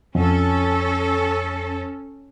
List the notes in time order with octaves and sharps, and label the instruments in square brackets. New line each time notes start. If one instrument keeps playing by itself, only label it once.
[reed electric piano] F2 [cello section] C#4 A4